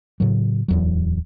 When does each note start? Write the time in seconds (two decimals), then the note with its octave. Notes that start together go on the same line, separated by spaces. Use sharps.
0.20 A2 C#3 F#3
0.68 D1 E2 F#3